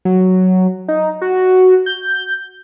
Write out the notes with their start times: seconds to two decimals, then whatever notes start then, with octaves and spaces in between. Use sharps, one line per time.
0.05 F#3
0.88 D#4
1.21 F#4
1.86 G6